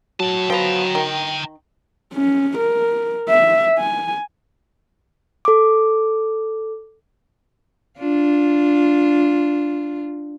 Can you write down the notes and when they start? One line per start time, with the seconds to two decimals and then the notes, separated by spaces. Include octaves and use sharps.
0.20 A2 F#3 A5
0.50 F3 B3 G5 A#5
0.95 D#3
2.14 C#4
2.58 A#4
3.29 E5
3.79 G#5
5.45 A4 D6
7.99 D4 F4